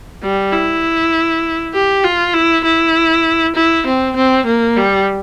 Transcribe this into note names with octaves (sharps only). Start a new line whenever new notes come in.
G3
E4
G4
F4
E4
E4
E4
C4
C4
A#3
G3